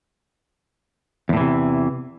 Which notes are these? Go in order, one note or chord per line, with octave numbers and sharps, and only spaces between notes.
E2 A2 C3 E3